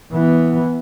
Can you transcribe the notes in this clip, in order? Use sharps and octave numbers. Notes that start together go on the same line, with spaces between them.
E3 B3